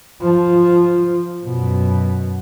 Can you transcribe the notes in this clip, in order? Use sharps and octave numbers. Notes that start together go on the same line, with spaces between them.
F3
F#2 B2